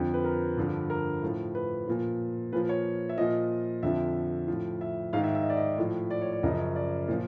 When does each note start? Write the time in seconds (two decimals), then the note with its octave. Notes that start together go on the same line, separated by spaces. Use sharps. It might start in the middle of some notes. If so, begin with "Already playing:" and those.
Already playing: F2 D3 F3
0.14 B4
0.24 A#4
0.57 G2 D3 F3
0.90 A#4
1.22 A2 F3
1.55 B4
1.87 A#2 F3
2.53 A#2 F3 B4
2.69 C#5
3.09 E5
3.18 A#2 F3 D#5
3.83 F2 D3 F3 E5
4.48 A2 F3
4.81 E5
5.13 G#2 F5
5.17 D#3
5.24 E5
5.35 E5
5.43 D#5
5.50 D5
5.57 D#5
5.78 A2 F3
6.10 D5
6.21 C#5
6.32 D5
6.43 F#2 C#3 F3 D#5
6.76 D5
7.08 A#2 F3